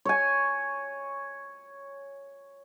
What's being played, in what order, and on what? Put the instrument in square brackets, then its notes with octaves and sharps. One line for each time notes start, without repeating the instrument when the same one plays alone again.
[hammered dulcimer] C#5 G#5